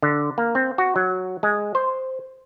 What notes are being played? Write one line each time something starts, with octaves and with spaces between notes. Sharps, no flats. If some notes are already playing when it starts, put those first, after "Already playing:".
D3
A#3
C4
F#4
F#3
G#3
C5